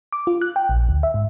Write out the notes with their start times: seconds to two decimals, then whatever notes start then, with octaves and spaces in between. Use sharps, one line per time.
0.12 D6
0.27 F4
0.41 F#6
0.56 G5
0.69 A#1
0.89 D2
1.03 E5
1.14 G#2